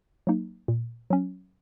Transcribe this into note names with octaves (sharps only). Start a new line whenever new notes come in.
F#3 A#3 D#4
A#2
F#3 C#4